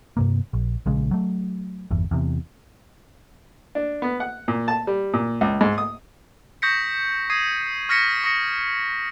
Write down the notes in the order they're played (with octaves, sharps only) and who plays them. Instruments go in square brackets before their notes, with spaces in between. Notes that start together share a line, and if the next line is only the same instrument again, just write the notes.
[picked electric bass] G2 C3 A#3
A#1
A#1 C#3 G#3
F#3 A3
G1 E2
E2 C3
[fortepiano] D4
B3
F#5
A#2
A5
G3
A#2
C#2
G#2
D#6
[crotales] C#6 D#6 G6 A#6 B6 C#7
D#6 G#6 C7 D#7
C#6 F6 G#6 A#6 B6 C#7
C#6 D#6 A#6 C#7